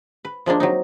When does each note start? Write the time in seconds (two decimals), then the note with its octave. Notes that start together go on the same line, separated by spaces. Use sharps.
0.25 B4
0.46 F3 G#3 A#3 D4
0.60 F#3 C4 D#4